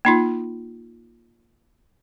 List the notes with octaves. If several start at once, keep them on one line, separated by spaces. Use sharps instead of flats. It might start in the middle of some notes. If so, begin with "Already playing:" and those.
A#3 D#4 F4